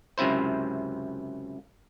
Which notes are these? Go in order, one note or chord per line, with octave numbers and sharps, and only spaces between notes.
C#2 F#2 C3 E4 C5